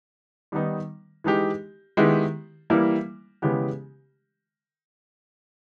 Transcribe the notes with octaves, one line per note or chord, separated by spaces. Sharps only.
D#3 G3 B3 D#4
E3 G#3 D#4 G4
D#3 G#3 B3 E4 G4
E3 G3 A#3 E4
C#3 E3 G#3 B3 G4